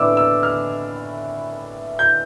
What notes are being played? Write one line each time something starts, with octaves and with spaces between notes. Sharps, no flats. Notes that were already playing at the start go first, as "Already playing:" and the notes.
Already playing: A2 E3 B3 D4 D6 E6
E6
F6
G6